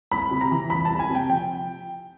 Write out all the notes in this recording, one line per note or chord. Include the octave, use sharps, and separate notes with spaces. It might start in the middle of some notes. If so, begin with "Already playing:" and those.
C2 B5
C3
A#5
E3
C2 B5
A5
C2
G#5
C3
G5
F3 G5